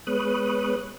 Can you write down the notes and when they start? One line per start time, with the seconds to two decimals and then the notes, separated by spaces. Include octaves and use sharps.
0.07 G#3 B3 B4 C#5 D#6 F#6